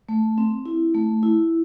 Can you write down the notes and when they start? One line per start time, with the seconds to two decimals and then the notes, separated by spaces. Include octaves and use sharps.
0.09 A3
0.38 C4
0.66 E4
0.94 A3
1.23 E4